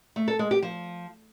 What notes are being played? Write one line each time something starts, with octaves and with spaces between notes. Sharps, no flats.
A3
A4
G#3
G4
F3